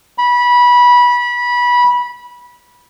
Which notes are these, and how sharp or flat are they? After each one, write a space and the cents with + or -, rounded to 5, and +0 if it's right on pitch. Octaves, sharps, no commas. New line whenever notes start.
B5 -20